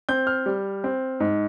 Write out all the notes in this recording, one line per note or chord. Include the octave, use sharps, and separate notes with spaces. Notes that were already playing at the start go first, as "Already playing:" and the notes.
C4 G6
F6
G3
C4
G#2